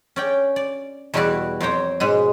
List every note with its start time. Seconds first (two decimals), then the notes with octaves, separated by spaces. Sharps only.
0.16 C#4 D5 G5
0.56 D5
1.14 E2 B2 G3 E4 F#4 D5
1.61 F2 C5 C#5 G5 A#5
2.00 G#2 B2 G#3